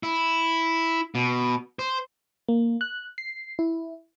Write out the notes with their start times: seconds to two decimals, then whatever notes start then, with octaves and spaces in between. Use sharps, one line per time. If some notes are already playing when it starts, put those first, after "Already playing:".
0.03 E4
1.15 B2
1.79 C5
2.48 A#3
2.81 F#6
3.18 C7
3.59 E4